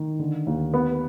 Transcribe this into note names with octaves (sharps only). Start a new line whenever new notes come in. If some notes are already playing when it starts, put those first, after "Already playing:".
Already playing: D#3
D3
D#2
B3